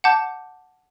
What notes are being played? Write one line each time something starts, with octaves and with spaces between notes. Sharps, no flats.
F#5 A5 D6 G6